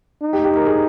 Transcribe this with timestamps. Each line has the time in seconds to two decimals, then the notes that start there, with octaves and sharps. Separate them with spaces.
0.22 D#4
0.33 G4
0.44 G4
0.56 A#4
0.66 G#4